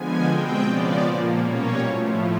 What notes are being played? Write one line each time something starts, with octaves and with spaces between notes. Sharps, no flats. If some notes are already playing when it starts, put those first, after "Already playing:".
Already playing: D3 F3 G#3 B3 G#5
B2 G#3 C4 G5
C#3 F3 G#3 B3 D5
A#2 F3 A#3
B2 G3 A#3 C#4 C#5
A2 F3 A3